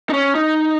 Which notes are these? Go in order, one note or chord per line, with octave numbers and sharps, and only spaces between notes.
D#4
C#4
D#4